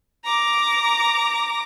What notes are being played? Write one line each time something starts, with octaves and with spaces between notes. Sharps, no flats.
A#5 D6